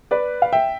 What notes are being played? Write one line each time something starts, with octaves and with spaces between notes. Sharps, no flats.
B4 D5
F5
E5 G5